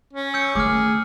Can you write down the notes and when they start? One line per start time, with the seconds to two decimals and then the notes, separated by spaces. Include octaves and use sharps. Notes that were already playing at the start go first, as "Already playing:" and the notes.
0.13 C#4
0.34 E6 G6 C#7
0.55 D#3 A3 G#4 D6 F6